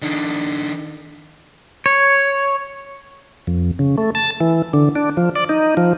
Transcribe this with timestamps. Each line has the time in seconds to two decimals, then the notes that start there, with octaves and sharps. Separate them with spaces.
0.02 D#3 D4
1.86 C#5
3.47 F2
3.79 C#3
3.98 A3
4.15 A5
4.40 E3
4.73 D3
4.96 D4
5.17 F3
5.36 D5
5.49 D#4
5.77 F3